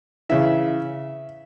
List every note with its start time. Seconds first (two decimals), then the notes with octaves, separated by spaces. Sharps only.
0.29 C#3 E3 E5